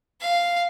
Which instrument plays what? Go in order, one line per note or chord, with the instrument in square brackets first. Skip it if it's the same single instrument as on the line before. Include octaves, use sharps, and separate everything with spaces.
[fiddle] F5